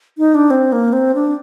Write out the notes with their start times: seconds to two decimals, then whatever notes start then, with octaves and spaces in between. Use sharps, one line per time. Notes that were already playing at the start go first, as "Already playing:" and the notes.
0.18 D#4
0.35 D4
0.50 C4
0.72 A#3
0.93 C4
1.15 D4